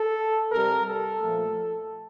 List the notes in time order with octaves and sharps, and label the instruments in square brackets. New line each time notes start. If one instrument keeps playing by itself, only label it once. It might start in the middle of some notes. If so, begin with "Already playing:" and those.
Already playing: [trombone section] A4
C3 G3 A#4
A4
A#2 F3 A3